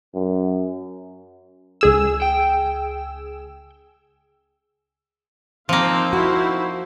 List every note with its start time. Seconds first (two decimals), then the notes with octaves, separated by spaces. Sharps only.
0.15 F#2
1.81 C#2 G#4 E6
2.22 G5
5.69 F3 A#3 C4 D#4 F4
6.13 D#4 E4 F#4 C5